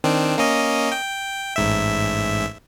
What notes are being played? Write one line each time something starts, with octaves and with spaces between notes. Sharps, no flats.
D#3 C4 D4
A#3 C#4 D#5
G5
A1 G#2 E5